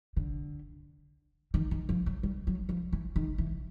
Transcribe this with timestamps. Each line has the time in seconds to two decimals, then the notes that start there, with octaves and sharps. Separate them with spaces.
0.17 D3
1.54 D#3
1.71 D#3
1.89 F3
2.06 F#3
2.23 G3
2.47 F#3
2.69 F3
2.93 E3
3.16 D#3
3.38 E3